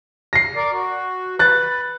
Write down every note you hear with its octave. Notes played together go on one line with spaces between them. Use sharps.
A#6 C7
A#4 D5
F#4
B4 F#6 A6